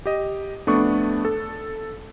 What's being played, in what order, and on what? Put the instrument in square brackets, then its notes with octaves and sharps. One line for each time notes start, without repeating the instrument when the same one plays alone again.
[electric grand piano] G4 D#5
F2 A3 B3 D4 C#6
A4